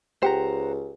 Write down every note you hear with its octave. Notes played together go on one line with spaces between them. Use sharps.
C#2 G4 C5 F#5 A#5